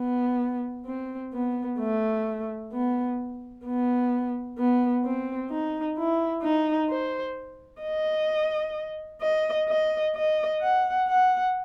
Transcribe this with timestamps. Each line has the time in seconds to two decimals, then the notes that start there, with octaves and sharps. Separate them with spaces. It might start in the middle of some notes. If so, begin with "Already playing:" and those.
Already playing: B3
0.86 C4
1.33 B3
1.79 A3
2.72 B3
3.65 B3
4.58 B3
5.05 C4
5.51 D#4
5.97 E4
6.43 D#4
6.90 C5
7.83 D#5
9.22 D#5
9.69 D#5
10.16 D#5
10.62 F#5
11.08 F#5